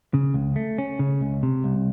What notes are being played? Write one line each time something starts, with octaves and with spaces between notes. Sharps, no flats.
C#3
C#2
A3
C#4
C#3
C#2
C3
C2